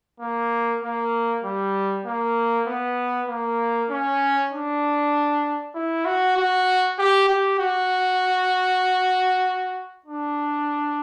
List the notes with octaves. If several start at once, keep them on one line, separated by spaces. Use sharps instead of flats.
A#3
A#3
G3
A#3
B3
A#3
C#4
D4
E4
F#4
F#4
G4
G4
F#4
D4